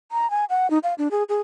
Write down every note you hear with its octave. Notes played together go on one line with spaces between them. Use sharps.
A#5
G#5
F#5
D#4
F5
D4
G#4
G#4